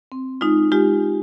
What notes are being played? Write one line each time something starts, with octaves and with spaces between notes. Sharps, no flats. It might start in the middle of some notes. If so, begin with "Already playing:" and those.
C4
G#3 D#4 F4
G#3 F4 G4